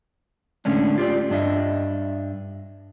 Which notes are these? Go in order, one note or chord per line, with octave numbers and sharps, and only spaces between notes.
A2 D3 G#3 C#4 D4
F4 G4 D5
G2 D4 D#5 E5